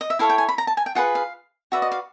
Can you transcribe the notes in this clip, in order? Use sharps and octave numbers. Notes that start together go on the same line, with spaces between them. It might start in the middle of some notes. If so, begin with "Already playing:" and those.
D#5
E5
E4 A4 C#5 F5
G5
G#5
B5
A#5
A5
G#5
G5
F4 G#4 B4 F#5
F5
F#4 B4 D5 E5
D#5
F5